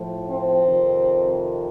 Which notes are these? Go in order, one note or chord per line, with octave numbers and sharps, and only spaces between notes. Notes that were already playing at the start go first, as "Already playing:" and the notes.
Already playing: A2 F3
C4
F2 C3 D#3